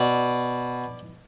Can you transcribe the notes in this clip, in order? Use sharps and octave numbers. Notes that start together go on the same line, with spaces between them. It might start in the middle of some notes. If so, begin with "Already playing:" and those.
Already playing: B2 D5